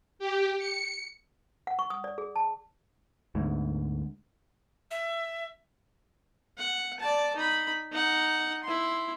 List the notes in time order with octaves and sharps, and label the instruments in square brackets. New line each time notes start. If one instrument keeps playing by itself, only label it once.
[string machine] G4
C#7
[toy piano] F#5
C#6
D#6
D5
G#4
A5
[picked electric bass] D2 G#2
[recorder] E5
[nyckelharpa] F#5
D5 A5
D#4 B5
D#4 F#5
E4 C6